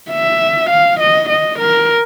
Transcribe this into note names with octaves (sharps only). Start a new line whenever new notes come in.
E5
F5
D#5
D#5
A#4